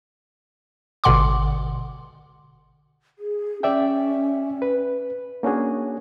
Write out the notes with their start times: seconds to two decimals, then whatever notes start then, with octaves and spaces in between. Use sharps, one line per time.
1.04 G#1 B2 D3 F#5 C6 D6
3.18 G#4
3.63 C#4 D5 E5 G5
4.62 B4
5.43 A#3 C#4 D4 F#4 G#4